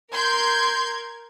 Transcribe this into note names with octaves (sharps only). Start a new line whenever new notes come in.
A#4 C6 G6 G#6